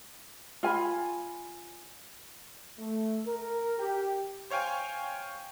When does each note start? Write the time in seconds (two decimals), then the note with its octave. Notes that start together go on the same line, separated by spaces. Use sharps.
0.63 F4 G#5 B5
2.79 A3
3.26 A#4
3.79 G4
4.50 C5 C#5 F5 G5 G#5